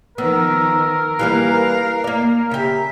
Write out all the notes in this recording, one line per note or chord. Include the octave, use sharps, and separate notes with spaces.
D#3 F3 B3 A#4 E6
E3 G3 A#3 F5 F#6
A#3 D5 A#5
C#3 G4 E5